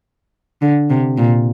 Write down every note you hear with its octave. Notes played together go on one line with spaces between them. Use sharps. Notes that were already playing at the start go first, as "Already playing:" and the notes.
D3
C3
A#2